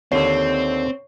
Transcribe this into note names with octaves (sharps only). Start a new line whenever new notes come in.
D#2 D3 C4 C#5 C7